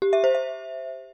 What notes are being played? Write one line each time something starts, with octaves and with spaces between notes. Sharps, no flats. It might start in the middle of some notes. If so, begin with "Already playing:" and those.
G4
E5
C5
E5